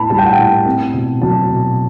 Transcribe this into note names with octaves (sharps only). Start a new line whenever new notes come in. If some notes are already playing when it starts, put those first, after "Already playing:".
Already playing: A2 B3 A5 B5
G3 A5
G5
F#5
G5
A2
C4
B2
F#3 A5
B2